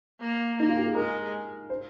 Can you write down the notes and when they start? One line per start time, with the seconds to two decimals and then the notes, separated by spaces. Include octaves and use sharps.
0.20 A#3
0.58 A#3 D#4
0.68 F4
0.77 G4
0.85 G#4
0.94 G#3 A#4
1.70 C5